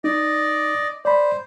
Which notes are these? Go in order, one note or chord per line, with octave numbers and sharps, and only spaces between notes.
D#4 D5 D#5
C5 D5 B5